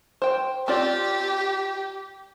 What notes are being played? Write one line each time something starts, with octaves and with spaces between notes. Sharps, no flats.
C5 G5
C4 F4 G4 D5